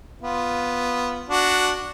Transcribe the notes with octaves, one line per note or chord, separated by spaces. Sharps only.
B3 F4
D4 F#4